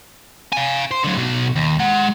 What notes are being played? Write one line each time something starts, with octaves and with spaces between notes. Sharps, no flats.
F5 G#5
C5
D3 F#3
B2 F#3
D#2
G#3 F#5